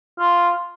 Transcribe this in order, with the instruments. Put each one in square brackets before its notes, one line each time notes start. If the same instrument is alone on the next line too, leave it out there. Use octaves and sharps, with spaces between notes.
[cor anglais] F4